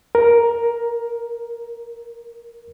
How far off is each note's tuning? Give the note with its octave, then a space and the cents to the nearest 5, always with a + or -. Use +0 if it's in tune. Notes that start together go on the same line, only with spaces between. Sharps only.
A#4 +10